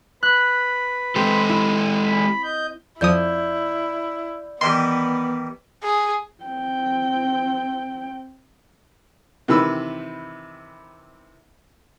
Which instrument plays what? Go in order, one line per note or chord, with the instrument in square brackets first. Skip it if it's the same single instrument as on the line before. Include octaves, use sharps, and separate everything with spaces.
[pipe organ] B4 B5 [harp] F#6
[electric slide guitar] G#3 G4 A4 [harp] C4
[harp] E4
[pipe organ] B5
D#5 G6
[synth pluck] F2 F3 D#6 [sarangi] E4 [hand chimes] D5 G6
[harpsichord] D#3 E3 G3 [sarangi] B3 [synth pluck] C6
[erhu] G#4
[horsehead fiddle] C4 G5
[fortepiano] C3 D#3 E3 B4 B5 E6